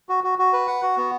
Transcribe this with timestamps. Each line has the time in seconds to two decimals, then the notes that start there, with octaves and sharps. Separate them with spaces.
0.09 F#4
0.24 F#4
0.39 F#4
0.53 B4
0.67 F#5
0.83 F#4
0.97 B3